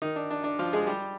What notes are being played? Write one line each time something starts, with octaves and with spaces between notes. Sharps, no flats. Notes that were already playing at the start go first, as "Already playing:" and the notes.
D#3 D#4
D4
D4
D4
F3 F4
G#3 G#4
G3 G4